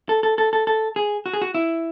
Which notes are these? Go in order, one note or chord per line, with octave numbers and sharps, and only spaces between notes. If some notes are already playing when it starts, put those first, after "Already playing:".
A4
A4
A4
A4
A4
G#4
F#4
G#4
F#4
E4